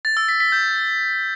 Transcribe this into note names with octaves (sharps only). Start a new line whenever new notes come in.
A6
E6
B6
B6
G6